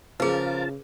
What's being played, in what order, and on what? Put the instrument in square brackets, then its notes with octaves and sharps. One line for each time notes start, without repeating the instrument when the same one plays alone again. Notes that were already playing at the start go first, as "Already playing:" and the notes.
[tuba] C#3 [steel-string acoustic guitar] F3 A#4 [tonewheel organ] F4 A5 [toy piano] G#4 B4